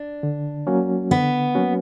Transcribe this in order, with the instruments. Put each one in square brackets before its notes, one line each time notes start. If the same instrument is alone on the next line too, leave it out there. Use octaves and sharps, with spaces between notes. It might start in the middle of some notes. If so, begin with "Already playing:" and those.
Already playing: [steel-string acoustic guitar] D4
[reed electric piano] D3
F#3 A#3 C#4 F#4
[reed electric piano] D3 [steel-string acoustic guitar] B3
[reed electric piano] F#3 A#3 C#4 F#4